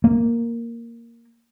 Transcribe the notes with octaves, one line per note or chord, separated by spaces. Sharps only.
A#3